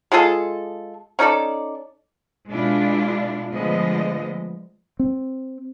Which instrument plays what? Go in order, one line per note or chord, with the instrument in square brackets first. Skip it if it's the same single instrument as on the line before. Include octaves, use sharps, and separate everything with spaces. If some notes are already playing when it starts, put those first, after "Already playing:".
[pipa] G#3 F4 G#4 A4
C#4 D#4 A4 D5
[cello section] B2 G#3 D4 E4 F4
D3 F3 G#3 A3 B3 D#5
[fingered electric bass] C4